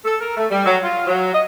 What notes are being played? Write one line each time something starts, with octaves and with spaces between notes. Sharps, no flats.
A4
A#4
A3
G3
F#3
F4
F#3
D#5